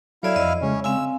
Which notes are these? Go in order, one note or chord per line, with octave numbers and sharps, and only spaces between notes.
F#3 E4 A4 C#5 D5 E5 F5 G#6
F2 D#5 E6
C#3 G#3 C#4
C4 F5 G#5 E6